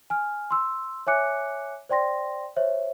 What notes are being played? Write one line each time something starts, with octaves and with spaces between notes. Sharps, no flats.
G#5 F6
C6 E6
C#5 E5 G#5 D6 F#6 C#7
C5 D5 G5 C6 A#6
C5 C#5 E5